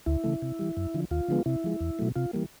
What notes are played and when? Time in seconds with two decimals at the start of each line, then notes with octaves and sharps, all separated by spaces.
0.06 D2 E4
0.24 C#3 E3 A3
0.42 C3
0.59 E3 G3
0.77 F#2
0.94 D3 F3
1.11 D#2 F4
1.28 D3 F3 G#3 B3
1.46 C3 E4
1.64 F3 G#3
1.81 E2
1.99 B2 F#3 A3
2.16 C3 F4
2.33 E3 G3 A#3